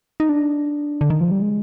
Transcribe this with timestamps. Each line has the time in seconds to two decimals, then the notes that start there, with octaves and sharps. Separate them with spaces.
0.20 D#4
0.29 D4
1.01 D3
1.10 D#3
1.21 F3
1.31 G3
1.42 G#3